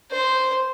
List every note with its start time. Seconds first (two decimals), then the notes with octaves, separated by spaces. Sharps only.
0.11 C5